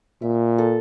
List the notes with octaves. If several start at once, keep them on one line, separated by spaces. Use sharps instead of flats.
A#2 E5
A4